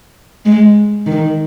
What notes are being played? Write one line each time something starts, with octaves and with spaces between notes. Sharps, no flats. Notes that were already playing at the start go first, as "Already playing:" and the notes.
G#3
D#3